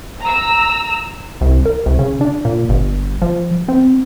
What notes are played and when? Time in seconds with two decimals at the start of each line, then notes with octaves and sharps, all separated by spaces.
0.22 A#5 E6
1.41 C2
1.65 A#4
1.86 C2
1.99 C#3
2.21 D4
2.45 A#2
2.69 G1
3.22 F3
3.68 C4